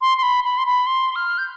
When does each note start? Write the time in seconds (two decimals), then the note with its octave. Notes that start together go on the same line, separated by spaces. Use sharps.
0.01 C6
0.18 C6
0.23 B5
0.44 B5
0.58 C6
0.66 B5
0.87 C6
1.16 F6
1.38 G6